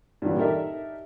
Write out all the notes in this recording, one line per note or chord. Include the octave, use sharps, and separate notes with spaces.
G2 A#2 D3 E3 F#3 G3
D#4 G4 A4 A#4 D5 E5